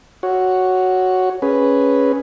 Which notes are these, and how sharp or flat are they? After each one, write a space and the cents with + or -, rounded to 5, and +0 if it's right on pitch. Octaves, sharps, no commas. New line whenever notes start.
F#4 +0 C#5 +0
C#4 +0 G#4 +0 B4 +0